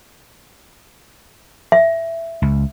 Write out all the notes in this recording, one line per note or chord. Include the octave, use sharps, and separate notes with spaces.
E5
C#2